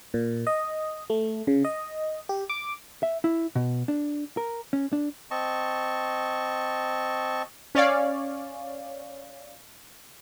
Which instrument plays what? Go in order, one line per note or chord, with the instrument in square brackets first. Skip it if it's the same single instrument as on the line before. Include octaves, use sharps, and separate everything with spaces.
[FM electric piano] A#2
D#5
A3
C#3
D#5
G4
D6
[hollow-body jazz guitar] E5
E4
B2
D4
A#4
C#4
D4
[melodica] C4 D#5 A5 C#6
[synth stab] C#4 C#5 D5 F5